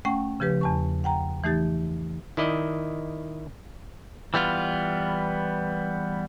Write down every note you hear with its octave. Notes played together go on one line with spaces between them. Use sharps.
A3 C#4 F#5 G5 C#6
C#3 F3 G4 B4
E2 A5 C#6
F#5 G5 A#5
E3 A3 D#4 G4 A6
D#3 E4 D5 D#5
E3 G3 B3 F4